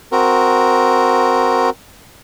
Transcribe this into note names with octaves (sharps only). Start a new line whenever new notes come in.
C4 F#4 A#4